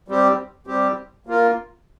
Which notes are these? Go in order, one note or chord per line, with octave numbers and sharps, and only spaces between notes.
G3 C4 G4
G3 C4 G4
A#3 F4 A#4